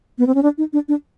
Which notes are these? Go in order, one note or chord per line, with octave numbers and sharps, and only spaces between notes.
B3
C4
C#4
D4
D#4
D4
D4